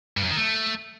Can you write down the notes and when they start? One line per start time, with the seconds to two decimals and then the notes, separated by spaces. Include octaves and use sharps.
0.17 G2
0.24 F#2
0.30 D#3
0.37 A3